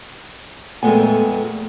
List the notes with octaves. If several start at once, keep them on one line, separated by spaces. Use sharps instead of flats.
F2 A#2 G#3 A3 B3 G#5